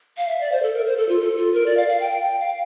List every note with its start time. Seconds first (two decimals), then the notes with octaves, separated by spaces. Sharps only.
0.17 F5
0.28 E5
0.40 D5
0.52 C5
0.63 A4
0.74 A#4
0.86 C5
0.97 A4
1.09 F4
1.20 A4
1.37 F4
1.54 A#4
1.66 D5
1.77 F5
1.88 F5
2.00 G5
2.11 G5
2.23 G5
2.40 F5